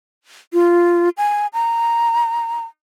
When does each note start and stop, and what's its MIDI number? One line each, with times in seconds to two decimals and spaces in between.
0.53 1.09 65
1.17 1.47 80
1.53 2.65 82